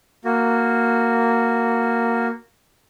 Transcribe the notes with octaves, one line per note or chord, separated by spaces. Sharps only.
A#3 F#4